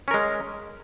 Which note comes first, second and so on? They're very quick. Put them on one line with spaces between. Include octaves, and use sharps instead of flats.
C#4 A#4 G#3